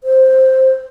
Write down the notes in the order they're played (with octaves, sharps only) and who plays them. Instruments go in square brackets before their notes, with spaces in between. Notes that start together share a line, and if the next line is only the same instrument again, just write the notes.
[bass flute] C5